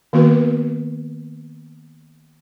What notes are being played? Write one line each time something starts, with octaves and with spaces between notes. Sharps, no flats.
D#3 A#3 B3 F#4 B4